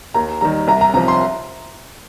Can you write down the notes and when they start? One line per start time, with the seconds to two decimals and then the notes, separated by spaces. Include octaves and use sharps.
0.14 D#2 A#5
0.41 D#3 G3 A#5
0.67 C2 A#5
0.81 A#5
0.94 C3 F3 A#5
1.08 C6